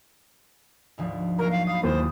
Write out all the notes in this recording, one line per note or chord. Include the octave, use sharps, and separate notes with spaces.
G#1 D2 F3
F#3 A#3 A#4 A#5
F5
F5 B5 D#6
D#2 E3 C5